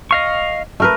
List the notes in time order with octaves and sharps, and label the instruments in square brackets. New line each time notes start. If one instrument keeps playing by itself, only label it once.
[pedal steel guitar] D#5 F5 C#6
[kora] A3 A#4 B4